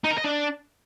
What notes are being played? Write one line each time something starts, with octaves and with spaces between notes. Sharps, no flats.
D#4
A#4
D#5
D4